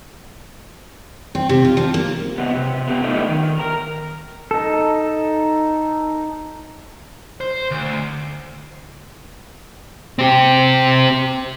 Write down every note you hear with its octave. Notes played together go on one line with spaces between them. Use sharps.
C4
C3
F4
F3
A#3
C#3 B3
C3
B3 G4
A3 B3 D4 D#4 F4
D#3
A#4 A#5
D#4 A4
C5
D2
C4 G4